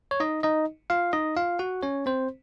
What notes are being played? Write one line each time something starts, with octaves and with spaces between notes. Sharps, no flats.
C#5
D#4 D#5
D#4 D#5
F4 F5
D#4 D#5
F4 F5
F#4 F#5
C#4 C#5
C4 C5